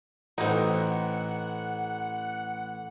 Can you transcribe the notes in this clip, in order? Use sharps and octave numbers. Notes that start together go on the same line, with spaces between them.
A1 C4 D#4 F#5